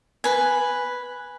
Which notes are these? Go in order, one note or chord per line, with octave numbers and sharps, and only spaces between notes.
B4 G#5